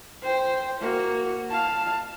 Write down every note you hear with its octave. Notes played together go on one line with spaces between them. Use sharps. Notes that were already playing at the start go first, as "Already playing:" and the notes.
C5 G5
A#3 F#4
F5 A5